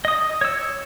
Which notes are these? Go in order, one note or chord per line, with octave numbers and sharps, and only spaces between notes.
D#5 D#6
C#5 E6